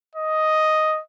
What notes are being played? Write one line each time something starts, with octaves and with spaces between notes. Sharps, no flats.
D#5